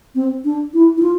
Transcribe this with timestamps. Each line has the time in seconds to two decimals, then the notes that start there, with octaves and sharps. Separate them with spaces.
0.15 C4
0.45 D4
0.74 E4
0.97 E4
1.03 F4